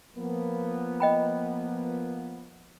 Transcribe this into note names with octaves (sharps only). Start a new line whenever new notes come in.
F3 A#3 B3
D#5 G5 B5